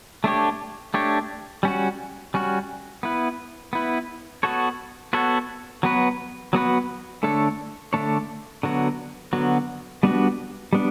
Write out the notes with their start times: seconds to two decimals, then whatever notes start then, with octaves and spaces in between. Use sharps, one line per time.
0.24 A3 D4 G4 C#5
0.94 A3 D4 G4 C#5
1.63 G3 C#4 F#4
2.34 G3 C#4 F#4
3.03 B3 E4 B4
3.73 B3 E4 B4
4.43 B3 F#4 A4 C#5
5.13 B3 F#4 A4 C#5
5.83 F#3 B3 F#4 B4
6.53 F#3 B3 F#4 B4
7.23 D3 A3 D4 A4 C#5
7.93 D3 A3 D4 A4 C#5
8.63 D3 F#3 B3 F#4
9.33 D3 F#3 B3 F#4
10.03 G3 B3 D4 F#4
10.73 G3 B3 D4